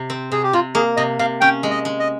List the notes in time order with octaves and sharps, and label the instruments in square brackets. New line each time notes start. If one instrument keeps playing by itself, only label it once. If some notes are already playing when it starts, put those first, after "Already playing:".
Already playing: [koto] C3
C4
[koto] C3 [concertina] G#4
[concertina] G4
[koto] C3 [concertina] F4
[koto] A#3 [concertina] G#4
[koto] C3 [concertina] D#5
[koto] C3 [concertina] F5
[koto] C#4 [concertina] G5
[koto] G#3
[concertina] D#5
[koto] G#3
[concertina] D#5